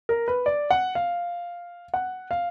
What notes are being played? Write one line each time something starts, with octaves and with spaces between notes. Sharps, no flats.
A#4
B4
D5
F#5
F5
F#5
F5